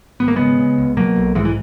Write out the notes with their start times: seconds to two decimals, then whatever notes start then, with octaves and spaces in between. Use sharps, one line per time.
0.20 G#1 B3
0.28 A#3
0.36 C#3 G#3 B3
0.59 C#3
0.78 C#2
0.97 B2 F#3 A#3
1.16 B1
1.35 G#2 E3 G#3
1.45 E3